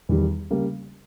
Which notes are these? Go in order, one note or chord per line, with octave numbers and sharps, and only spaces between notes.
E2 D#3 G3
C#3 G3 A#3